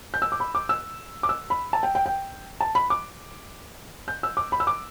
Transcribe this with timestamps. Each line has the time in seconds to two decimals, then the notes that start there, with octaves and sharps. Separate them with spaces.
0.14 G6
0.22 E6
0.32 D6
0.40 B5
0.55 D6
0.69 E6
1.23 D6
1.29 E6
1.50 B5
1.73 A5
1.83 G5
1.95 G5
2.06 G5
2.60 A5
2.75 B5
2.90 D6
4.08 G6
4.23 E6
4.37 D6
4.52 B5
4.60 E6
4.67 D6